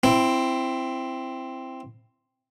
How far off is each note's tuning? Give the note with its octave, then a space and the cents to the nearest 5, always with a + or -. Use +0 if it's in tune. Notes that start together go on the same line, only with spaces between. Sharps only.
C4 +0 E4 +20